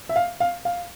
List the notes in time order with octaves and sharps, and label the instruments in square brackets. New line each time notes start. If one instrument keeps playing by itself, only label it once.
[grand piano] E5
F5
F5
F5